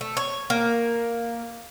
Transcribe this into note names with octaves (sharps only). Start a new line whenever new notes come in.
A3
C#5
A#3